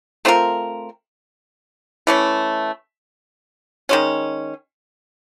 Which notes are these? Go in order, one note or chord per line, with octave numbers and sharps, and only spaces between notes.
A3 C4 F4 A#4
E3 A3 C#4
D#3 G#3 C#4